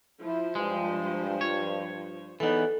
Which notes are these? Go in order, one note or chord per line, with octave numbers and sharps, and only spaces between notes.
F3 E4 C5
G2 G#3
C#5
E2 E3 F#3 B3 D#4 A4